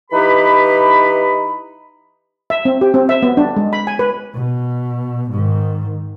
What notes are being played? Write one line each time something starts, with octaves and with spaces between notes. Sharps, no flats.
E3 D#4 G4 B4 B5
E5
C4
G4
C4
E5
B3
D4
G#3
B5
G#5
B4
B2
G#2 D#3